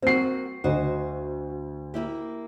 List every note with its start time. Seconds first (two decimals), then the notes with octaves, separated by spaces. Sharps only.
0.02 A#3 C4 F#4 C7
0.64 D2 F#4 C5 D#5
1.94 A#3 E4 G4